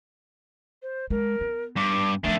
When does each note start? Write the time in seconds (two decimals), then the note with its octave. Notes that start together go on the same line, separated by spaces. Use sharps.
0.83 C5
1.10 G#3 A#4
1.41 B3
1.77 G2 D6
2.24 D#3 F3 A3 D4 E5